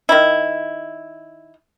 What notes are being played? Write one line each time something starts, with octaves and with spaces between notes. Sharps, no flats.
D#3 E4